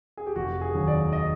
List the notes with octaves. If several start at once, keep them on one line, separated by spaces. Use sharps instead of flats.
G#4
G4
F1 F#4
G#4
D#2 D#3 F#3
D5
D#5